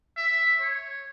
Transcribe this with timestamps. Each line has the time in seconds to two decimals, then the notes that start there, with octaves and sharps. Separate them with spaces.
0.16 E5
0.61 C#5